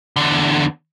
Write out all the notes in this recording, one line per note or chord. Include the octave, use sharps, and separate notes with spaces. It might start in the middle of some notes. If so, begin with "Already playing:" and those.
E2 D3